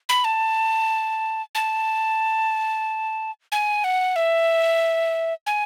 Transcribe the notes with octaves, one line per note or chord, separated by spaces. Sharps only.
B5
A5
A5
G#5
F#5
E5
G#5